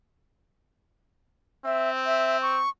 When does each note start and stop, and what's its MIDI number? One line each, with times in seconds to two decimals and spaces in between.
1.65 2.63 60
1.65 1.90 76
2.06 2.37 76
2.42 2.69 85